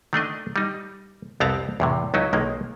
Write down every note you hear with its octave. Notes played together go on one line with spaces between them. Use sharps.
D#3 A3 D4 D#5
G3 D#4
C2 F2 B3 C4 A5 A#5
E2 A2 C3
C#2 F#3 D#4 E4
B1 D#3 G#3 A#3